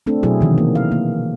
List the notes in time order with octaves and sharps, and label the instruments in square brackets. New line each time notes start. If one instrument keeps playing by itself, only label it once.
[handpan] A3 C4 D4 A4
B2 F#3 E4 G#4
C3 D#3 E3
A#3
F5
A#3